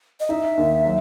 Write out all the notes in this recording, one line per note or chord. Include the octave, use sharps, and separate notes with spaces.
D#5
D#4 E5
D#2
F#3